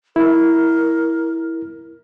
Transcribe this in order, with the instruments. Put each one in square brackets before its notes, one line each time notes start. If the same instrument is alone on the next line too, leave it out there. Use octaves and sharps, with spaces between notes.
[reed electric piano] E4 [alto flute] A#4